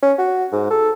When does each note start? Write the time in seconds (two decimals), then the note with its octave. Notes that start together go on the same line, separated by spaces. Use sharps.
0.03 C#4
0.18 F#4
0.52 G#2
0.70 A4